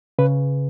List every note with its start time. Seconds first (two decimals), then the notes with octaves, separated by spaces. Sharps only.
0.19 C#3 B4